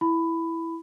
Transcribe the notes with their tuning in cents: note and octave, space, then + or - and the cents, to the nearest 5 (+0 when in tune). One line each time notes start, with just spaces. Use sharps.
E4 +0 B5 +15